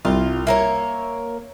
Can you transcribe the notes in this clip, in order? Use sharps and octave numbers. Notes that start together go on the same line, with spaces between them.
C2 F4
A#3 A#4 C#5 E5